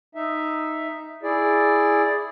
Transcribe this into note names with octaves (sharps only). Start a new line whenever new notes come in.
D#4 E5
E4 G#4 D5